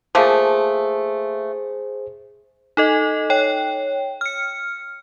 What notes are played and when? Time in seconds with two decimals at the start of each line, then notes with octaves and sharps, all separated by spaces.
0.15 F3 A3 A#3 G#4 C5
2.77 D#4 A4 D#5
3.30 C#5 G5
4.21 F6 C#7